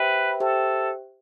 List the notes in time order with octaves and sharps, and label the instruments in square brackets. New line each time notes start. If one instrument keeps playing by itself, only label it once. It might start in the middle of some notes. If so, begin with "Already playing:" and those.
Already playing: [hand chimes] G4 C5 E5 G5 [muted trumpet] B4
[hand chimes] G4 C5 E5 G5 [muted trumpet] A4